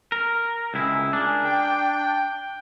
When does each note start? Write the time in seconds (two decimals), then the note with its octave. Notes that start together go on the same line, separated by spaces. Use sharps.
0.12 A#4
0.74 C#2 C4 E4 G#4
1.13 D4 G#4 A#4
1.44 G5